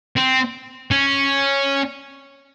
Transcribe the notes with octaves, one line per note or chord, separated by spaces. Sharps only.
C4
C#4